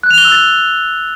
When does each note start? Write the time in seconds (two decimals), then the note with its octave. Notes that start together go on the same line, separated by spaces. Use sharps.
0.03 F#6
0.11 F7
0.18 G7
0.25 E6
0.32 A6